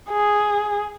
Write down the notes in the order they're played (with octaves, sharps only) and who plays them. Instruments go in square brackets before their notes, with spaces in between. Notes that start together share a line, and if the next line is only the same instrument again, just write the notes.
[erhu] G#4